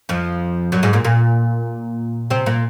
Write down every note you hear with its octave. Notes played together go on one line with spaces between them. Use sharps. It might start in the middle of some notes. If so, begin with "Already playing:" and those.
F2 F3
F#2 F#3
G#2 G#3
A#2 A#3
A#2 A#3
C3 C4
A#2 A#3